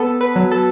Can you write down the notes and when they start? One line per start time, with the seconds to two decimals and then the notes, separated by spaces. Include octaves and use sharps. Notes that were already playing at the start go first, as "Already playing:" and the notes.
Already playing: B3 A4
0.21 B4
0.36 F#3
0.52 A4